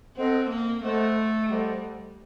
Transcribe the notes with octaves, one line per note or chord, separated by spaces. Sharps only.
C4 A4 C5 D#5 F#5
A#3
A3 A4 C5 D#5 F#5
G3 A4 C5 D#5 F#5